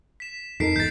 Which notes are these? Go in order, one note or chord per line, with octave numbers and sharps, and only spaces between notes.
B6 E7
F2 D#4 A4 A#4 B6 C7 D7
G1 E2 G#2 G6 A6